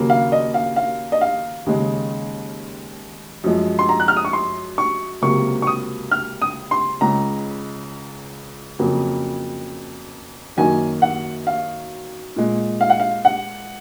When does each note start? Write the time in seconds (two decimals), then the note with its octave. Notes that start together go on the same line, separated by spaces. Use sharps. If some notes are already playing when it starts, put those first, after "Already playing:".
Already playing: D#2 C#3 F#3 A#3
0.10 F5
0.32 D#5
0.54 F5
0.76 F5
1.12 D#5
1.21 F5
1.66 D#2 C#3 G#3
3.44 F#2 F3 G#3
3.79 C6
3.89 A#5
4.00 F#6
4.08 F6
4.17 D#6
4.25 C#6
4.33 C6
4.78 C#6
5.22 C#2 C3 F#3 A#3 C#6
5.62 C#6
5.67 D#6
6.11 F6
6.42 D#6
6.71 C6
7.01 C#2 C#3 G#3 A#5
8.79 F2 C#3 F#3 A#3
10.57 F#2 D#3 F#3 A#3 G#5
11.02 F#5
11.47 F5
12.36 A#2 G#3
12.81 F5
12.90 F#5
13.00 F5
13.25 F#5